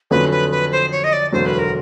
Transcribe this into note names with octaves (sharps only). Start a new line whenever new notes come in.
F2 D3 F#3 A3 C#4 B4
B4
B4
C5
C#5
D#5
D5
E1 D2 D3 F#3 C5
B4
A#4